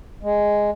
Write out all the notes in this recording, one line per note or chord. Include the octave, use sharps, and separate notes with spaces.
G#3